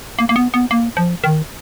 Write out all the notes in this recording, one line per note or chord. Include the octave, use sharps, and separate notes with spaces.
A#3
A#3
B3
B3
A#3
F3
D#3